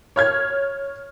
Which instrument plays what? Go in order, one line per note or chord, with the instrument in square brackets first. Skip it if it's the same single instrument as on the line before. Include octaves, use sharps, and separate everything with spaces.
[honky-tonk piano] C#5 F6 G#6